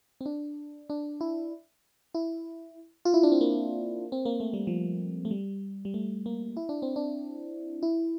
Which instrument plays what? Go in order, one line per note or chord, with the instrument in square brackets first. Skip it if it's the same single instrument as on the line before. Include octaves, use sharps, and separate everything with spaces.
[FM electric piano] C4
D4
D4
E4
E4
F4
E4
D4
C4
A#3
C4
A#3
A3
G3
F3
A3
G3
G3
A3
A#3
E4
D4
C4
D4
E4